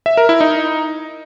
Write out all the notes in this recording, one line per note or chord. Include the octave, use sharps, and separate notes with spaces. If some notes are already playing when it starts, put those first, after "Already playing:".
E5
A#4
E4
D#4